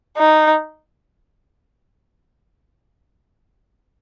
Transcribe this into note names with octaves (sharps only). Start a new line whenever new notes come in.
D#4